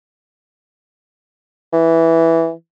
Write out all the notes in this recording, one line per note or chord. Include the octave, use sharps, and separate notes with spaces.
E3